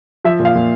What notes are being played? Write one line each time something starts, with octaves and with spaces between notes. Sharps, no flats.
F3 E5
A#2
F5
A#2